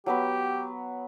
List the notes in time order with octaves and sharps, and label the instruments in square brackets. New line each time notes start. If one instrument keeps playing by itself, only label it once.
[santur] F#3 B3 B4 [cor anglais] G4